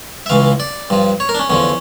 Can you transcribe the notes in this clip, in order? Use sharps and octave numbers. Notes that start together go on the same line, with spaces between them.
E5
C#2 C#3 E3 F5
D5
G2 F3
C#5
A#4
D4
C#4
E2 D3 F3 C#4